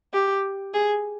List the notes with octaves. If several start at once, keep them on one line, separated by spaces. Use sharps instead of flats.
G4
G#4